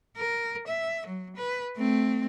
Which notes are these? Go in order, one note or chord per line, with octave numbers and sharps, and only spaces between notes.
A#4
E5
F#3
B4
A3 C4